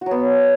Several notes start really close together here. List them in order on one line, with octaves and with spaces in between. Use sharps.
F#4 F#3 B3